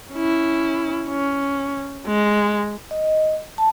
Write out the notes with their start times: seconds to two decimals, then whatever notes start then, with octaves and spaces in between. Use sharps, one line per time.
0.13 C#4 E4
1.08 C#4
2.07 G#3
2.91 D#5
3.58 A5